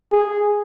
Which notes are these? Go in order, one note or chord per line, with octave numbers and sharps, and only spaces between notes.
G#4